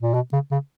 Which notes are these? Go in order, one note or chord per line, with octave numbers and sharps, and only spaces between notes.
A#2
B2
C#3
C#3